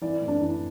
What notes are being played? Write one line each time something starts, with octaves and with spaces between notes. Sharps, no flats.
E3 D5
A2
D4
E3